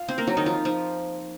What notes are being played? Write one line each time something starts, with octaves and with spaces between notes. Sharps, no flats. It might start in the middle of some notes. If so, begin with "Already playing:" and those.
Already playing: F4 F5
C4 C5
A#3 A#4
F#3 F#4
D#3 D#4
F3 F4
F3 F4